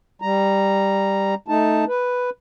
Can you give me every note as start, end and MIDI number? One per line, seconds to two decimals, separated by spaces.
0.22 1.35 55
0.22 1.35 82
1.48 1.84 57
1.48 1.84 63
1.48 1.84 81
1.88 2.30 71